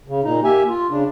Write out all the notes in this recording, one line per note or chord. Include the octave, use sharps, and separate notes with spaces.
C#3
A#2 D#4
A#3 G4 E5 G#5
F4
C#3 D4